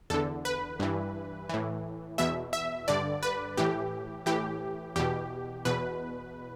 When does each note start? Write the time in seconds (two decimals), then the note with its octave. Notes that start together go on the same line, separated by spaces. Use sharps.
0.10 E2 D3 A4
0.45 B4
0.79 G2 E3
1.49 A2 E3
2.18 E2 B2 E5
2.53 E5
2.88 G2 D3 D5
3.23 B4
3.57 A2 E3 G4
4.26 A2 E3 G4
4.96 E2 B2 G4
5.65 E2 B2 B4